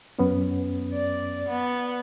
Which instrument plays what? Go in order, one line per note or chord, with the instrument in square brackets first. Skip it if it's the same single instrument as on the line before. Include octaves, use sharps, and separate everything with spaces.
[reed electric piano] F#2 B3 C#4
[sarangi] D5
B3